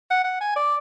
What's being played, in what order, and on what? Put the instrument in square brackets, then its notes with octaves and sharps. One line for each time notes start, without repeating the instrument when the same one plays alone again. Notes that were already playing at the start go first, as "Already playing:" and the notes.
[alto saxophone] F#5
F#5
G#5
D5